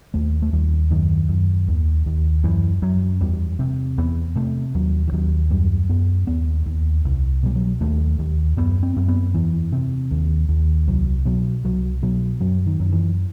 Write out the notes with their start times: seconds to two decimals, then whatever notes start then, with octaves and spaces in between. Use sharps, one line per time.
0.14 D#2 A3
0.42 A3
0.53 D#2 G3
0.90 F#2 D#3
1.29 F#2
1.68 D#2
2.06 D#2
2.44 F#2 E3
2.82 F#2 F#3
3.21 E2 G3
3.59 C3
3.98 E2 B3
4.36 C3 A3
4.74 D#2 F#3
5.08 E3
5.12 D#2 F#3
5.50 F#2 G3
5.89 F#2 B3
6.27 D#2 B3
6.66 D#2
7.05 C2
7.43 B2 G3
7.55 F#3
7.81 D#2 A3
8.19 D#2
8.57 F#2 B3
8.83 C4
8.96 F#2
9.08 B3
9.34 E2 E3
9.72 C3
10.11 D#2
10.49 D#2
10.88 C2 F#3
11.26 B2 F#3
11.64 C2 F#3
12.03 B2 F#3
12.41 F#2 F#3
12.66 D#3
12.80 F#2
12.92 E3